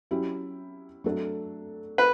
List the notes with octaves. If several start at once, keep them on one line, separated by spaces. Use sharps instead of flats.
F#3 C#4 E4 G4
F#3 A3 D4 A4
B4